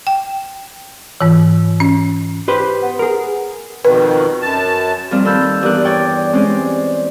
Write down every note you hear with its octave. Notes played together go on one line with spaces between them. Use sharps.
G5
G#2 E3
C#4
G4 B4 C5
B3
G#4 A#4
F2 B2 D#3 B4
F#2 A5
F2 A#2 G3 C4 F6
D#2 A4 B5 E6 F6 G6
E2 G2 G4 A#4 D5 F#6
C#5 D5 G5
G#3 C4 C#4 G4 C5 D5